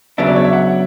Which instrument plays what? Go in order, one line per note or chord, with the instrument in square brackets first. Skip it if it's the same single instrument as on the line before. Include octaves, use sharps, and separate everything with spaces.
[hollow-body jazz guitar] C#3 F#3 B3 D4 [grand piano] E5
[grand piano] D5
C#5
E5
F#5